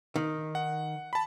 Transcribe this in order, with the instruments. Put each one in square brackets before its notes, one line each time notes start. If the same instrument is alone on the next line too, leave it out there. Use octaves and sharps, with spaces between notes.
[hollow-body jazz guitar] D#3
[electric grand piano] F#5
A5 B5